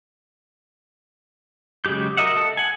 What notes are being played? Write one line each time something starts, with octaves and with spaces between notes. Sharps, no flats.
C#3 F#3 G#3 G4 G6
F#4 A#4 D#5 E5 F#5
A4
F#5 G#5